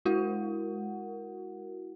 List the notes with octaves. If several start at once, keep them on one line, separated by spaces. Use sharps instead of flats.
G#3 E4 F#4 A#4 F#5